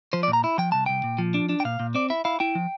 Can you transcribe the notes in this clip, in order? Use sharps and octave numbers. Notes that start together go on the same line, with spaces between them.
F3 C5
D5
A#2
A#5
E4
F3 G5
C2 A5
C2 G5
A#2
F3
D4
D4
G5
A#2 F5
A#2
C4 D5
E4 E5
E4 F5
E4 G5
F3